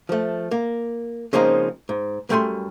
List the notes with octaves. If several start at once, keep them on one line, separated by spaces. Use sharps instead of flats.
F3 A3
A#3
C#3 F3 G#3 A#3 C4 D#4
G#2
F#2 G3 A3 G5 G#5 C6